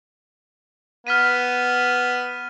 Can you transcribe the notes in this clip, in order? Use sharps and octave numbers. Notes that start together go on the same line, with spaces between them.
B3 F6 B6 D#7